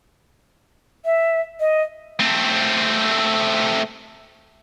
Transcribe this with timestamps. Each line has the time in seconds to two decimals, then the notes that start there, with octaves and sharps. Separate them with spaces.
1.05 E5
1.60 D#5
2.19 A3 C4